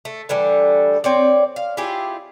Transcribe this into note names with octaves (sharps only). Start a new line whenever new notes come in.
A3
D3 E3 G3 A3
C4 C#5 D5
F5
E4 F4 G4 G#4